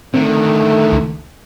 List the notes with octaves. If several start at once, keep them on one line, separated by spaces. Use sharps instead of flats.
D3 D#3 A3 C4
C#2